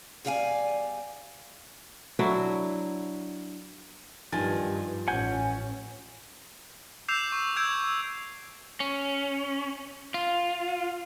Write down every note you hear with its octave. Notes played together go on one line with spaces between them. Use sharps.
E2 G3 D5 F5 G5 G#5
F#3 D4 E4
G2 D#3 F3 G#5 A6
A1 C#4 F#5 G#5 G6
D6 E6 G6 C7 E7 F7
C#6
E6 G6 G#6 D7 F7
C#4
F4